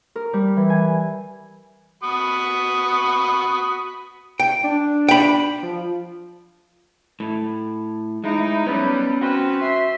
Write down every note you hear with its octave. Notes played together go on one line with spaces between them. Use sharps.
A#4
G3
E3
G#5
F#4 B5 D#6
G5
D4
G5 B5
F3
A2
G#3 D#4 E4
F#3 G3 B3 C#4 B4
C4 C#4 F#4 B4 C5
E5 C6